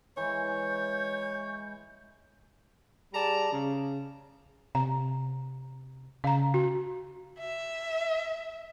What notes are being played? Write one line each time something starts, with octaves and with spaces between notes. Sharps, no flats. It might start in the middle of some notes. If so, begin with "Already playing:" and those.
E3 G#3 C#5 G6
G3 G#4 D5 A5 A#5
C#3
C3 A#5
C#3 F5 A#5
F#4
E5